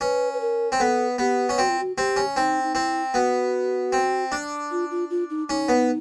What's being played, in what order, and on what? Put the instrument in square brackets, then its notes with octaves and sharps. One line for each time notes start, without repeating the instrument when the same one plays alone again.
[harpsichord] C#4 [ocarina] B4
[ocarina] B4
A#4
[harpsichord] C4
[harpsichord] B3 [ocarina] A4
[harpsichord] B3 [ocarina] G4
[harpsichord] C#4
[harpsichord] C4 [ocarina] F#4
[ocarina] F4
F#4
[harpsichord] C4 [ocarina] G4
[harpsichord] C#4
[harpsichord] C4 [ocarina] D#4
[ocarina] D#4
[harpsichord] C4 [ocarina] E4
[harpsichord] B3 [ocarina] F#4
[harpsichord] C4
D4
[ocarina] F4
F4
F4
D#4
[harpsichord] C#4 [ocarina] D#4
[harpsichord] B3